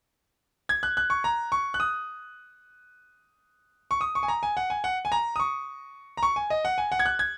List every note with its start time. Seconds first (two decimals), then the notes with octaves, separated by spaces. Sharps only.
0.69 G#6
0.83 F#6
0.97 F#6
1.10 C#6
1.24 A#5
1.52 C#6
1.74 F#6
1.80 D#6
3.91 C#6
4.01 D#6
4.15 C#6
4.23 G#5
4.28 A#5
4.43 G#5
4.57 F#5
4.70 G#5
4.84 F#5
5.05 G#5
5.12 A#5
5.36 D#6
5.40 C#6
6.17 A#5
6.23 C#6
6.36 G#5
6.50 D#5
6.65 F#5
6.78 G#5
6.92 F#5
6.99 G#6
7.06 F#6
7.19 G#6